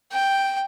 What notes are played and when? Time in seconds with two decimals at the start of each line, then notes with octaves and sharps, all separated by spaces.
0.12 G5